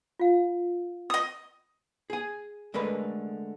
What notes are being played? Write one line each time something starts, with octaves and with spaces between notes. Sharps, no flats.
F4 F5
D#5 D#6
G#4 G#5
D3 G#3 A3 A#4 B4